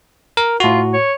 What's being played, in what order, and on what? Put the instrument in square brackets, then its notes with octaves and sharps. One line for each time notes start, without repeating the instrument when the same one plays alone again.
[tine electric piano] A#4
[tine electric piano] A2 F#4 [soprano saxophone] F4
[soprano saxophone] C#5